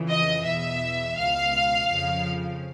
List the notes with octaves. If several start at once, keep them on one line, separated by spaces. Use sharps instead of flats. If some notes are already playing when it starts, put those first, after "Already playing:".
Already playing: F2 C#3 E3
D#5
E2 B2 E5
C#2 B2 F5
F2 C#3 F3